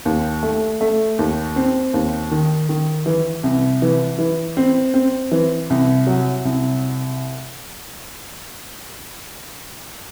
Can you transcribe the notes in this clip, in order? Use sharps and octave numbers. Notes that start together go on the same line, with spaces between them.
D#2
A3
A3
D#2
C4
D#2
D#3
D#3
E3
C2
E3
E3
C4
C4
E3
C2
F#3
C2